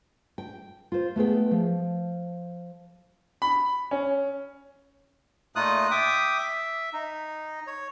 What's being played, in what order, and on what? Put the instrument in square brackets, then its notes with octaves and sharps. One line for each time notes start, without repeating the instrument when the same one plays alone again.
[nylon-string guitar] G5
F4 C5
A3 B3 G#4 G5
F3
[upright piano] B5
C#4
[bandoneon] A#2 A3 D#4 F4 D#6 F#6
E5 G5 D6 D#6
E5
D#4
C#5